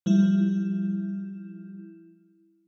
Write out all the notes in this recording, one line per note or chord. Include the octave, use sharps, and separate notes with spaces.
F3 G3 E4